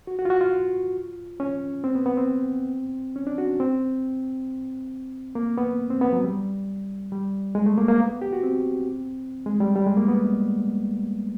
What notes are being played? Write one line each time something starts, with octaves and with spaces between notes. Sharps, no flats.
F#4
F#4
F4
F#4
F4
C#4
C4
B3
B3
C4
C#4
D4
F#4
C4
A#3
B3
C4
B3
F#3
G3
G3
G#3
A3
A#3
A#3
B3
G4
F#4
C4
G#3
G3
G3
G#3
A#3
B3